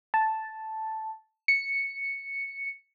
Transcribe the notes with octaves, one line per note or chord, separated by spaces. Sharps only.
A5
C#7